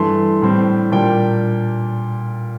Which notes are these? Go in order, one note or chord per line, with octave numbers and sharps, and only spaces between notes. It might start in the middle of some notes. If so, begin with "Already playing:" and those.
Already playing: G2 E3 A3 C6
A2 G3 C4
A#2 G3 A#3 D4 G5